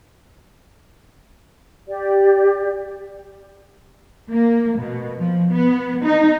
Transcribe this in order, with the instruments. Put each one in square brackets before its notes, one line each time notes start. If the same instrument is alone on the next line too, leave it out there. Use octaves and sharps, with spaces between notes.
[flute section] G4 D5
[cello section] A#3
B2
F3
B3
D#4